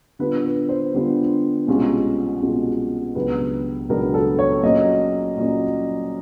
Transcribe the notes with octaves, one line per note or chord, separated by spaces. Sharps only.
D3 G3 B3 D4 F4 B4
B4
C5
D3 G3 B3 D4 F4
C2 B2 G#3 C#4 F4
C2 B2 G#3 C#4 F4
C#2 B2 F#3 B3 D4 B4
C#2 B2 F#3 B3 D4 A#4
A4
C#5
A#2 F#3 A#3 C#4 D#5
A#2 F#3 A#3 C#4